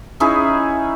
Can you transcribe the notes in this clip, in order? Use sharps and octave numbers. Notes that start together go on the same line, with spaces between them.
C#4 D#4 E4 G#4